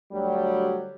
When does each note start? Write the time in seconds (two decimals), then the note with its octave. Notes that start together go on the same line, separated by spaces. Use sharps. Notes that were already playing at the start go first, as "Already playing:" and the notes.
0.12 D2 F#3 G3